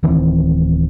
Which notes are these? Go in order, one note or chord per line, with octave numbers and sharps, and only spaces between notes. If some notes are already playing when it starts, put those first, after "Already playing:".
D1 D#3 E3 C4